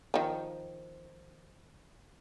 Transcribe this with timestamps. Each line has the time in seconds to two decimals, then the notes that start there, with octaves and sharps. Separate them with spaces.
0.14 D#3 F3